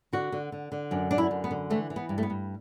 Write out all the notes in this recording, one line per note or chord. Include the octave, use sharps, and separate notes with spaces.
D3 F#4
D3
D3
D3
F#2 D4
D3 D4
E4
F#2
B3
D3
E3 A3
E3
B3
G2
A3
B3
G2